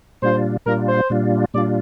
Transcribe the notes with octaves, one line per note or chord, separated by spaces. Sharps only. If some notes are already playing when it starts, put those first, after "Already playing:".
A#2 G3 D4 F4 C5
A#2 G3 D4 F4 A#4
C5
A#2 G3 D4 F4
A#2 G3 D4 F4 D5